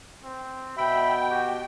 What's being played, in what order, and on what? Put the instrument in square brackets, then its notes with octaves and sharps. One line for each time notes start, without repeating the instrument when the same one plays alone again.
[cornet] C4
[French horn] B2 [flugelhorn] E5 [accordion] G5 [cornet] B5
[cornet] F#4 [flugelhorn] G4